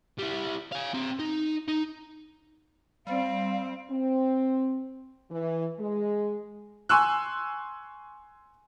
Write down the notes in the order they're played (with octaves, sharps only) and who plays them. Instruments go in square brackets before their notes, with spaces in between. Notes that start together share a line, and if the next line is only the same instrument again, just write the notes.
[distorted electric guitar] G3 E4
F5 G#5
C4 A#5
D#4
D#4
[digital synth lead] G3 [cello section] C4 [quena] F5
[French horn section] C4
E3
G#3
[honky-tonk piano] G#5 C6 C#6 E6 F#6